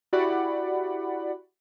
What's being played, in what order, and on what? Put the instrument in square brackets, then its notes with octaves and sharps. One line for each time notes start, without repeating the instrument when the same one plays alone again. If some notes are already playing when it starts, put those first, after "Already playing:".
[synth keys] E4 F#4 G4 D5 F#5 B5